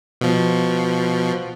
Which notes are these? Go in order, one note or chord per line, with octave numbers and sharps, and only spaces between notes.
B2 F3